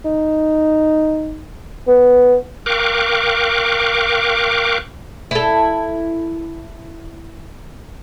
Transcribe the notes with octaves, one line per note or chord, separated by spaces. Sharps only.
D#4
B3
A#4 F5 G5 C#6 D6 F#6
E4 A4